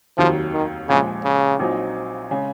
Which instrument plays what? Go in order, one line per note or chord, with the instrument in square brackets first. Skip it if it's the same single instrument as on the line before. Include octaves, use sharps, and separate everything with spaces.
[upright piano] F1 D#2 D#3 F#3 [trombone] F3
[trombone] D#3
[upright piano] A#1 A#2 F3 G#3 [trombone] C#3
[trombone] C#3
[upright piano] A#1 A#2 F#3 C4 D#4
C#3 G#3